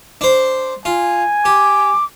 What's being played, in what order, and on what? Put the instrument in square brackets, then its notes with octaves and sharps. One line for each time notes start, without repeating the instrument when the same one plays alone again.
[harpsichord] D4 C5
[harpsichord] F4 [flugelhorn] G#5
[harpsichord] G4 [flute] D6